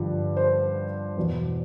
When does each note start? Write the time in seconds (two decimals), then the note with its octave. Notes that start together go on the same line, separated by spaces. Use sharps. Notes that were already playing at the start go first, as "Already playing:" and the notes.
Already playing: G2 D3 F3
0.37 C5
1.17 E2 B2